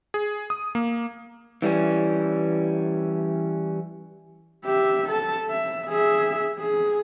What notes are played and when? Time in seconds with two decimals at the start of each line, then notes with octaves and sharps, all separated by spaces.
0.14 G#4
0.50 D#6
0.75 A#3
1.62 E3 G3 A3 C#4
4.65 G4 E5
5.09 A4 A5
5.49 E5
5.88 G#4 E5
6.58 G#4